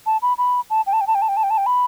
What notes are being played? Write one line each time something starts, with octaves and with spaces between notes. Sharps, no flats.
A5
B5
B5
A5
G5
A5
G5
A5
G5
A5
G5
A5
G5
A5
G5
B5